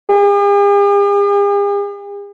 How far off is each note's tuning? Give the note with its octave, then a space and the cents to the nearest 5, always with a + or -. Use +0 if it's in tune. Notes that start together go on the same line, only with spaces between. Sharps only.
G#4 -45